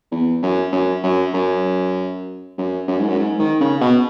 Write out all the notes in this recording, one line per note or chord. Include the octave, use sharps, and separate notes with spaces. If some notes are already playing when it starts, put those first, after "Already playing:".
E2
F#2
F#2
F#2
F#2
F#2
F#2
G#2
F#2
G#2
D#3
C#3
B2